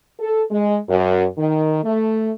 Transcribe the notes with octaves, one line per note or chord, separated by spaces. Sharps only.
A4
G#3
F#2
D#3
A3